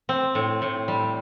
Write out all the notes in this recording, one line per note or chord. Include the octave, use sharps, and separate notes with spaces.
C4
A2
A2
G3